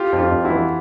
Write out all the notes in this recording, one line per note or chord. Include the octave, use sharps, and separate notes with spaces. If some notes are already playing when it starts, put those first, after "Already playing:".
Already playing: F4 G4
F2
F4 G4
F2
E4 F#4
E3